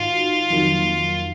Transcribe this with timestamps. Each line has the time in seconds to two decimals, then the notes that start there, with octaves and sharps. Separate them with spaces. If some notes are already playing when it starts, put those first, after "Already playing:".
Already playing: G#2 D#3 D#4 F4 F#4
0.50 F2 D#3 F#3 A#3